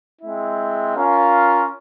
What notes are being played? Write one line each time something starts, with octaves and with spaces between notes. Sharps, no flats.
G#3 C4 E4
C#4 F4 A#4 F5